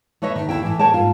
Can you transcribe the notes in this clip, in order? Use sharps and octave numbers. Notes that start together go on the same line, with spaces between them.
A3 B4 C#5 D#5 E5
D#3
D2 E4 G5
A2 E3
A#4 C#5 G5 A5
G#2 F4